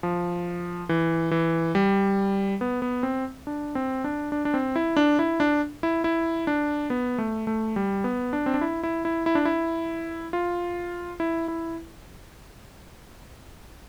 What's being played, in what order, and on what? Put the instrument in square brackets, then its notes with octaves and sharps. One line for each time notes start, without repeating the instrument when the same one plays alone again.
[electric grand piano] F3
E3
E3
G3
B3
B3
C4
D4
C4
D4
D4
D4
C4
E4
D4
E4
D4
E4
E4
D4
B3
A3
A3
G3
B3
D4
C4
D4
E4
E4
E4
E4
D4
E4
F4
E4
E4